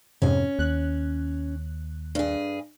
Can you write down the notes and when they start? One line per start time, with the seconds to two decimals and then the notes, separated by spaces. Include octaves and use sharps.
0.22 F2 G#2 C3 C#4
0.59 D#2 F#6
2.15 G2 G#4